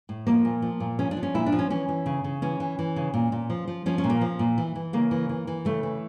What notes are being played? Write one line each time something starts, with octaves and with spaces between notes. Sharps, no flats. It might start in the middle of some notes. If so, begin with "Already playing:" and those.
A2
F3 A#3
A#2
F3
A#2
F3 C#4
D4
F3
C#4
A#2 E4
D4
F3
C#4
E3 C#4
E3
C#3
C#3
E3 C#4
E3
E3
C#3
A#2
A#2
F3
F3
F3 C#4
C#4
A#2
A#3
F3
A#2
E3
E3
C#3 A#3
E3
E3
E3
C#3 A3
E3